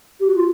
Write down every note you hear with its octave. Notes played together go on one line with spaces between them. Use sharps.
G4
F#4
F4